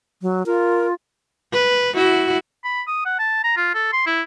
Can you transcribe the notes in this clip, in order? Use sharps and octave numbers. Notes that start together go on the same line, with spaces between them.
F#3
F4 A#4
B4
E4 F#4
B5
D#6
F#5
A5
A#5
F4
A4
C6
E4